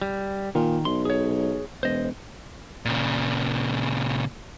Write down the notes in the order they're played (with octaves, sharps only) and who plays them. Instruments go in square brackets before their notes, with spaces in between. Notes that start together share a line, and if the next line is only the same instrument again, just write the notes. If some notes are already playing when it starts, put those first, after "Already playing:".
[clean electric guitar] G3
[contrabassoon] A#2 [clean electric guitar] D#3
[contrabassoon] B1 [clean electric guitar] C6
[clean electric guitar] G#4 C#5
[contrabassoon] E1 [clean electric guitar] C5 D#5
[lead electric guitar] A#2 C#3